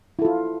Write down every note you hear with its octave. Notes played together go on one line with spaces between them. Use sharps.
E4 F4 A4